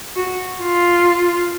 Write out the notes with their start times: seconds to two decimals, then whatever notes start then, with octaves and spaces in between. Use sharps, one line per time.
0.16 F#4
0.62 F4